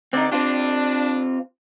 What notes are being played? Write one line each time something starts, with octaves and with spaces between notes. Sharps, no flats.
D3 C4 D#4 D5
C4 D4 F4 G4